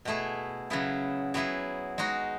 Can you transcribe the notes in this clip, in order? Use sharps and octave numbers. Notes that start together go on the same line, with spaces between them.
B2 A3 E4 G#4
C#3 F#3 B3 E4 G#4
F#3 B3 E4 G#4
G#3 D#4 F#4